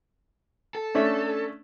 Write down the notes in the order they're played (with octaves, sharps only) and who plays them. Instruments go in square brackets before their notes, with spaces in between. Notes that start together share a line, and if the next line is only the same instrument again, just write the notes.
[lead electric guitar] A4
[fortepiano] A3 C#4 D4